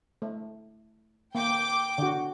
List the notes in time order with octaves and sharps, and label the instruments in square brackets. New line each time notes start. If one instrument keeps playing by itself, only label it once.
[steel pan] A3
[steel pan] A#3 [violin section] G5 D6
[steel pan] D3 F#4